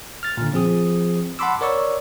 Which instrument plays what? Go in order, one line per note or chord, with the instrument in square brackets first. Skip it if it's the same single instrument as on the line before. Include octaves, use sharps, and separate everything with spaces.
[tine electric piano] F6 A6
A#2 D3
F3 C4 G#4 D#6
F#5 A5 B5 C6 D6 E6
A#4 C#5 D5 C#6 E6